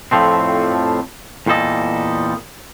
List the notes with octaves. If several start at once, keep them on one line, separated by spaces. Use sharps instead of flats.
F2 A2 F3 A3 C4
E2 A#2 G3 A4 D#5